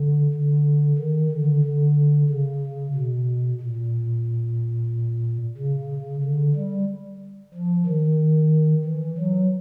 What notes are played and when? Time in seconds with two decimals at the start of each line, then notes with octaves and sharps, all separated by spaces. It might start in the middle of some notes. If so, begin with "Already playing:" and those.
Already playing: D3
0.33 D3
0.99 D#3
1.31 D3
1.64 D3
2.30 C#3
2.95 B2
3.60 A#2
5.57 C#3
6.23 D3
6.56 G3
7.54 F3
7.86 D#3
8.85 E3
9.18 F#3